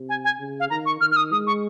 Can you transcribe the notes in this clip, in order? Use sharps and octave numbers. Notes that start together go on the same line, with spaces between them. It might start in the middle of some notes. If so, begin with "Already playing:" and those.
Already playing: C3
G#5
G#5
C#3
F5
D#3 A#5
C#6
D#3 F6
F6
D#6
G#3 D#6
C#6